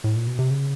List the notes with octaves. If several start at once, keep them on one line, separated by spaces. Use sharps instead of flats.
A2
A#2
B2
C3
C#3